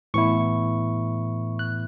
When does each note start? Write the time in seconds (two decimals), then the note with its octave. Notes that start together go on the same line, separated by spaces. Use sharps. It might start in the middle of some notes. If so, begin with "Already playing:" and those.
0.14 A2 E3 B3 E4 C#6
1.59 F#6